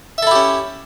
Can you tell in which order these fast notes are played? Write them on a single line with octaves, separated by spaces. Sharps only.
E5 A4 E4 G4 C#4